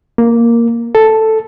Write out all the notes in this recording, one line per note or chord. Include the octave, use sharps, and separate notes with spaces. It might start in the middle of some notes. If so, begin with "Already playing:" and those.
A#3
A4